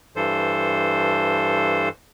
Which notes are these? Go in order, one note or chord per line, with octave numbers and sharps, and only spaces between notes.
G2 E3 A4 C5